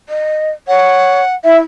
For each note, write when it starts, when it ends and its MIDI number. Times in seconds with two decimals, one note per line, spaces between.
0.09 0.51 75
0.68 1.21 73
0.68 1.35 78
1.45 1.60 64
1.45 1.58 76